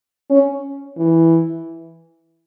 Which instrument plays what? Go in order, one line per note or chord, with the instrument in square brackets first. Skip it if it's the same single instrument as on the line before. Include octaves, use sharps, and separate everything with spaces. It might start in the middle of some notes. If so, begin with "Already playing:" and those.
[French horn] C#4
E3